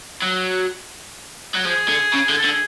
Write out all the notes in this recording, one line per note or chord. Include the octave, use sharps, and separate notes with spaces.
F#3
F#3
F3 G#4
D3
C#3
D3
A4
D3
G#4